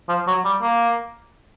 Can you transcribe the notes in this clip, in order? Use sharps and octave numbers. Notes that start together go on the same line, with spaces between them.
F3
F#3
G3
A#3